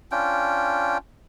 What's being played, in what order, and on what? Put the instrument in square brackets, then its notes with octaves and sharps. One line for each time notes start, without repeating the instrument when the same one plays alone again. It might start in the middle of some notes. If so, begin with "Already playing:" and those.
[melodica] C#4 D4 F4 G5